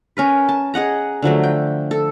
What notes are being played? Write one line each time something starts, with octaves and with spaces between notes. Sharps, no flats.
C#4 A#4 B4
A5
G#4 D#5 F#5 A#5
D3 F3 F#3 A3
G5
A4